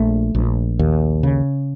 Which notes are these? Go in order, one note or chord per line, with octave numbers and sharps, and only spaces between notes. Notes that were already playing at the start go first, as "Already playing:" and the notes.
Already playing: A#1 A3
A#1
D#2
C#3